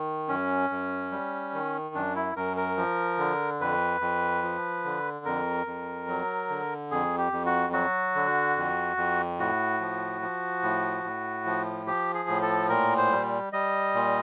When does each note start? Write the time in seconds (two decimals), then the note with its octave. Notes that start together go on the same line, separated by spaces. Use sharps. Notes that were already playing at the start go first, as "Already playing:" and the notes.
Already playing: D#3
0.29 F#2 C#4
0.70 F#2
1.12 G3
1.54 D#3
1.95 F#2 D4
2.16 E4
2.36 F#2 A#4
2.57 A#4
2.77 F3
3.18 D3
3.60 F2 B4
4.01 F2
4.43 F3
4.85 D3
5.25 F2 A#4
5.66 F2
6.08 F#3
6.50 D3
6.91 F2 G#4
7.18 G4
7.32 F2
7.46 F#4
7.73 F#3 F#4
8.15 D3
8.57 F2
8.97 F2
9.39 A2 F#4
9.80 F3
10.22 F3
10.63 A2
11.04 A2
11.46 F3
11.86 F3 G4
12.14 G#4
12.29 A2
12.42 A4
12.69 A#2 A#4
12.98 C5
13.11 G3
13.53 G3 D#5
13.94 A#2